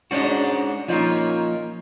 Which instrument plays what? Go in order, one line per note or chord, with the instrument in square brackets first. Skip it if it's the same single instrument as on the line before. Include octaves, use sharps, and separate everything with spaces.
[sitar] G#2 C#4 D#5 [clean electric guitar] G#3 D4 F#4
[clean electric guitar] F3 A#3 [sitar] C#4 D#4 F4